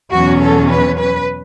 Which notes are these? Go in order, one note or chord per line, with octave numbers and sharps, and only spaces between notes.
E2 B2 F#3 C#4 F#4
A4
B4
B4